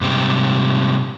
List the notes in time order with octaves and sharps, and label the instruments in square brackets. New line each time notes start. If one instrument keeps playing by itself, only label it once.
[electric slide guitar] G#2 C3 G3